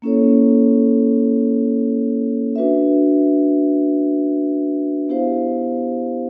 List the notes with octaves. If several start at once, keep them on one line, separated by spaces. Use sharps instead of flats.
A#3 C#4 E4 A4 C#5
D4 F#4 B4 E5
B3 E4 G4 C5 F5